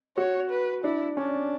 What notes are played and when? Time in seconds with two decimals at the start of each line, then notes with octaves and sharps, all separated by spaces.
0.17 F#4 C#5
0.50 B4
0.84 D4 E4
1.17 C#4 D4